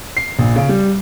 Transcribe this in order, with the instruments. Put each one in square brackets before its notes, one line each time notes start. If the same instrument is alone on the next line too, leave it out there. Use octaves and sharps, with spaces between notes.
[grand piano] C7
A#1
C#3
G3